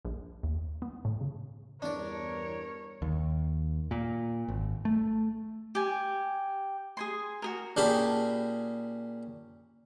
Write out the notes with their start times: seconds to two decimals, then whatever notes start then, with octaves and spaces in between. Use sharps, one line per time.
0.05 A#1
0.43 D#2
0.82 B3
1.05 A2
1.21 C#3
1.82 E2 G2 D4 A#4 C#5 D5
3.02 D#2
3.91 A#2
4.48 G#1
4.85 A3
5.75 G4 G#5
6.97 G#4 G#5 C6
7.42 F#4 G#4 A#4
7.77 A#2 C#4 G4 G#4 A5 B5